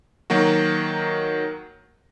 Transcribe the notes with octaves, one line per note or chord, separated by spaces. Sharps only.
D#3 F#3 A#3 F#4